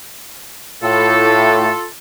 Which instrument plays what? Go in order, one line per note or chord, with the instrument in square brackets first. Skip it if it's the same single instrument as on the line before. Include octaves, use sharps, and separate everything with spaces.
[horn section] A2 [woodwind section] F4 A4